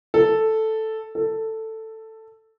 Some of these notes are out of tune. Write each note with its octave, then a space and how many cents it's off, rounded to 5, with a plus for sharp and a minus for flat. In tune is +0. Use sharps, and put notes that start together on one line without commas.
A4 +0
A4 +10